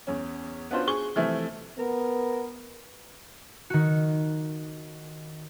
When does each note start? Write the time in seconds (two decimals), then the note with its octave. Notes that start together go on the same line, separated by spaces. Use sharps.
0.07 E2 C#4
0.71 B3 C#4 D4 F4 F#4 C5
0.87 G#4 C#6 G7
1.16 C3 E3 F3 A3
1.78 B3 A#4
3.70 D#3 F#4